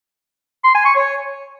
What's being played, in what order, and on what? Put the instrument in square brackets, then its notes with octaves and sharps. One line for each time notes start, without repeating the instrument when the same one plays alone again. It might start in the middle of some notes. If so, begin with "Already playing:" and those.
[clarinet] C6
G#5
C#6
C#5